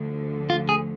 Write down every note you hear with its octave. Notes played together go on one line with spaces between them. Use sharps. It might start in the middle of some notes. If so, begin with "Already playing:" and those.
Already playing: D2 D3 F3
F4
G#4